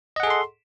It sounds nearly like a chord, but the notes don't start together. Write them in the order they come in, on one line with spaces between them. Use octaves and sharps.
D#5 F#5 G#4 A4 C6